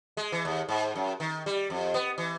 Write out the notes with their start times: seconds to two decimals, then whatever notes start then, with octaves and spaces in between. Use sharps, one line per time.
0.17 G#3
0.32 E3
0.45 D#2
0.69 G#2
0.95 F#2
1.20 D#3
1.46 G3
1.70 F2
1.94 B3
2.18 E3